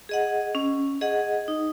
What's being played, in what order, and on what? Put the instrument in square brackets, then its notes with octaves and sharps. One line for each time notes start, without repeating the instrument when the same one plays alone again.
[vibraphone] G#4 D#5 F#5
C#4
G#4 D#5 F#5
D#4